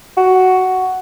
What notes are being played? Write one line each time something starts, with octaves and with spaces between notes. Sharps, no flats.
F#4